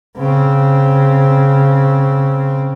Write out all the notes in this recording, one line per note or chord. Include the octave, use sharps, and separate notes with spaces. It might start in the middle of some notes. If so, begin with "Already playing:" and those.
C#3 C4